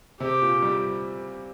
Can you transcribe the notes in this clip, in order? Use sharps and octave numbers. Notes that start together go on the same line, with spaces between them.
C3 G4
A#2
G3